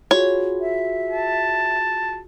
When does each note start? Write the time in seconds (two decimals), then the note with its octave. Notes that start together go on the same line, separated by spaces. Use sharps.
0.11 F4 F#4 G#4 C#5
0.61 E5
1.11 A5